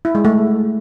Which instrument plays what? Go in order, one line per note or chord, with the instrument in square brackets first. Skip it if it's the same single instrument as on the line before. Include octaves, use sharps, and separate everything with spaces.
[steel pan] E4
G#3
A3